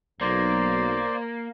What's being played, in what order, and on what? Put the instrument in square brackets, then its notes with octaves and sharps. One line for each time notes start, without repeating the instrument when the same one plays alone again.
[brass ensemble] B1 [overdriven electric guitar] A#3 [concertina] C5 D5